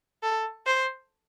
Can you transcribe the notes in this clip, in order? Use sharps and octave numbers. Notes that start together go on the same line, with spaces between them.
A4
C5